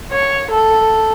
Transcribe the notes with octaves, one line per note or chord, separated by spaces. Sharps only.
C#5
A4